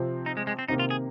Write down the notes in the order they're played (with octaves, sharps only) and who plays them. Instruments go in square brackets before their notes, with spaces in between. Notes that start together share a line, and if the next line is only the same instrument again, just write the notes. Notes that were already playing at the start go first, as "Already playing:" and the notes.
Already playing: [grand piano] C3 F3 C4
[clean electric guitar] D#4
G#3
G#3
C4
[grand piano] C3 D#3 A#3 [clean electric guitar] D#4
[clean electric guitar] F4
G#4